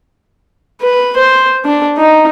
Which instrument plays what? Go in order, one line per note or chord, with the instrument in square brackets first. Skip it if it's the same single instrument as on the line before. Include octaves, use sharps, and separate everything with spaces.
[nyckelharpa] B4
C5
D4
D#4